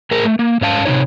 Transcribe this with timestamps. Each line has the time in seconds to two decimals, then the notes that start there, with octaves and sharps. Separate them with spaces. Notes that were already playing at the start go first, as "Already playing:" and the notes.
0.11 A2 G#4 A#4
0.24 A3
0.39 A#3
0.61 G#2 C#4 F5 A5
0.85 C3 D#3 D#4 C#5